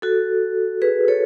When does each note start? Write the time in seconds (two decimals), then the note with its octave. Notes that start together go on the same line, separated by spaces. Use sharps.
0.02 F#4 A4
0.82 G#4 B4
1.08 A4 C#5